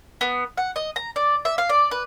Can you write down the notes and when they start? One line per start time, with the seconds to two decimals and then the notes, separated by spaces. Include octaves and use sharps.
0.21 B3
0.57 F#5
0.76 D#5
0.96 A#5
1.16 D5
1.45 E5
1.58 F5
1.69 D5
1.91 B4